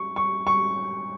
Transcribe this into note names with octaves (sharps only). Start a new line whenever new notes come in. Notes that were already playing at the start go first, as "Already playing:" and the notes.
Already playing: C#6
C#6
C#6